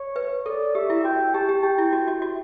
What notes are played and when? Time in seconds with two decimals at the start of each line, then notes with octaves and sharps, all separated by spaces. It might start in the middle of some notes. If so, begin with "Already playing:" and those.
Already playing: C#5
0.16 B4
0.46 A4 D5
0.75 G4 E5
0.90 E4
1.04 F#4 G5
1.34 G4 A5
1.49 G4
1.63 G4 G5
1.78 E4
1.93 F#4
2.08 F#4
2.22 F#4